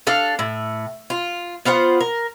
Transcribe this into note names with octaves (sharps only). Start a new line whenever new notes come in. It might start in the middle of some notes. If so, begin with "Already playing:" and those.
D4 A4 F5
A2
F4
B3 F4 C5 F#5
A#4